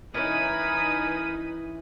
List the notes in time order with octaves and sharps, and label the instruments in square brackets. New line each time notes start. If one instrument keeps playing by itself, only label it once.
[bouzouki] E3 C#4 [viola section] D#4 B4 [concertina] A#4 G#5 [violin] B5 D#6